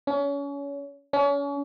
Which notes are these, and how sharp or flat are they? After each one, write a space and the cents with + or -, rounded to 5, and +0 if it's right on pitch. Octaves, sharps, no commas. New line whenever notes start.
C#4 +30
C#4 +35